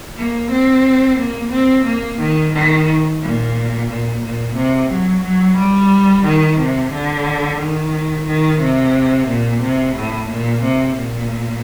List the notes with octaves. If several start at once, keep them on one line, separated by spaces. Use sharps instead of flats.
A#3
C4
A#3
C4
A#3
D#3
D#3
A#2
A#2
A#2
C3
F#3
F#3
G3
D#3
C3
D3
D#3
D#3
C3
A#2
C3
A2
A#2
C3
A#2